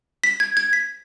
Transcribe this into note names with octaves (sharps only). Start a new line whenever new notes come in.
B6
G#6
G#6
B6